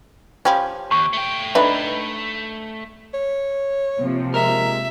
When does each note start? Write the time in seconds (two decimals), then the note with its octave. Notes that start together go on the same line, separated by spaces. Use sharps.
0.45 F3 C#4 G4 B5
0.91 D#2 C#6
1.13 A3 G5
1.55 D4 D#4 A4 B4 E5 A#5 B5
3.14 C#5
4.01 C3 F3 A#3
4.34 G#3 A#4 E5